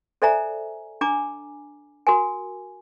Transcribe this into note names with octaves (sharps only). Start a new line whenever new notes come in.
A4 C5 D5 E5 G#5 A#5
D4 G#5 A#5 D6
F#4 A#4 G#5